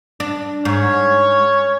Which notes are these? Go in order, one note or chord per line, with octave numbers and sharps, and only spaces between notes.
D4
G#2 C#4 C#5